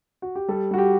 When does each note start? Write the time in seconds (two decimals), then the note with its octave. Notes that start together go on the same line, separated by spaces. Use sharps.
0.22 F#4
0.35 G4
0.48 G3 A4
0.71 G3 F#4
0.78 G4